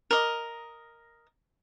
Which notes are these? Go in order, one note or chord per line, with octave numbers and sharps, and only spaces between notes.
A#4 D#5